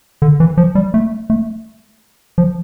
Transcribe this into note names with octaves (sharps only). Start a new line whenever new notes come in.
D3
E3
F3
G3
A3
A3
F3